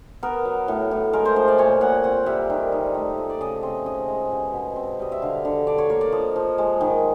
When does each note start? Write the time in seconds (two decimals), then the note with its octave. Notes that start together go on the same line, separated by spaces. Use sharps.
0.23 B3 A#4
0.45 F#3
0.68 A2
0.91 A2
1.13 G#3 A#4
1.25 C5
1.36 F3 C5
1.48 D5
1.58 A#2 C#5
1.81 A#2 F#5
2.04 C4 F#5
2.26 G3 E5
2.50 D#3
2.72 D#4
2.94 A3
3.18 F3
3.30 D5
3.41 C#3 D#5
3.63 C4
3.85 C#4 D#5
4.08 G#3
4.31 B2
4.53 B2
4.76 C4
4.99 G3 D#5
5.12 E5
5.22 D3 F5
5.45 D3
5.67 D4 D5
5.78 C#5
5.90 A#3 C#5
6.01 D5
6.12 F3 D#5
6.36 F3
6.58 G#3
6.81 D#3